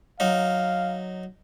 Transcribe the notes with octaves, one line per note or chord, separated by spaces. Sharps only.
F#3 D#4 F5